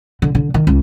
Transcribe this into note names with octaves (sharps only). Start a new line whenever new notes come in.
D3
D3
D#3
C#2